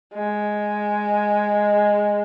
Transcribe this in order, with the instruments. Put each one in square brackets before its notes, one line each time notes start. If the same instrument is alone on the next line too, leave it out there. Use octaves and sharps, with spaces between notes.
[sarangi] G#3